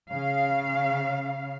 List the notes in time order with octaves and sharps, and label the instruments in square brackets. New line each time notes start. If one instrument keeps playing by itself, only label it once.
[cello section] C#3 F5